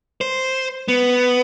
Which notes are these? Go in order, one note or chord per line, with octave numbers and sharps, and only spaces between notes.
C5
B3